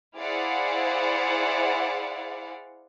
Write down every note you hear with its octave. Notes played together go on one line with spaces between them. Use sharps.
E4 G#4 C5 D5 F5 F#5